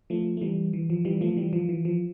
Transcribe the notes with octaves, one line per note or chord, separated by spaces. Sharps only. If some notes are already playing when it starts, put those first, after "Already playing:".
F3 A3
A3
E3 G3
E3
F3
E3 G3
F3 A3
E3 G3
F3
E3
F3